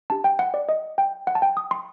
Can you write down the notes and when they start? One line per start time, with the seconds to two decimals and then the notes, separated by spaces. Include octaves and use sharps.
0.10 D4 G4 A5
0.24 G5
0.39 F#5
0.54 D5
0.69 D#5
0.98 G5
1.27 F#5
1.35 A5
1.42 G5
1.57 D#6
1.71 C6